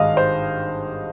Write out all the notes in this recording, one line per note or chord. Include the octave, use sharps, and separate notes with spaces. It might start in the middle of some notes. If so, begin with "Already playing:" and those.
Already playing: G#1 G2 D#3 G#3 D#5 F5
C5